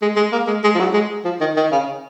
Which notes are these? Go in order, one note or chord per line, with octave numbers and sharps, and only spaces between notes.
G#3
G#3
A#3
G#3
G#3
F3
F#3
G#3
F3
D#3
D#3
C#3